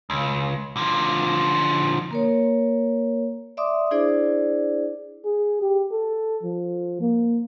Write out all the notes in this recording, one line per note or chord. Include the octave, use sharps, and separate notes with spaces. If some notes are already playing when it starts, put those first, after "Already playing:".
C#2
D3 F3
A#3 A#4 C#5
D5 E5 C6 D6 D#6
D4 E4 G#4 C5 D5
G#4
G4
A4
F3
A#3